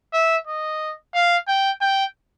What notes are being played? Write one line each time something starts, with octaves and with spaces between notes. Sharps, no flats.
E5
D#5
F5
G5
G5